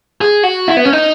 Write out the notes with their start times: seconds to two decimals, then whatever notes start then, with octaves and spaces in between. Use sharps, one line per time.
0.21 G#4
0.43 F#4
0.68 E4
0.77 B3
0.85 C#4
0.93 D#4